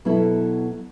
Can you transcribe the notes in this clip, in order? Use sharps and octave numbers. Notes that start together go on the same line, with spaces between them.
B2 F#3 B3 E4 A4